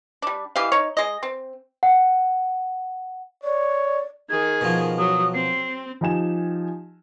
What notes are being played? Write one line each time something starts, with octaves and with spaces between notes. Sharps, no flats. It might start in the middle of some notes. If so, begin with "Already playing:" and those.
G3 D4
E3 G4 D#5 F5
D#4 C#5
G#3 D#5
C4
F#5
C#5 D5
D#3 G#4 G#6
B2 F3
F#3 D#6
C4 C7
F3 D#4 G4 G#5 E7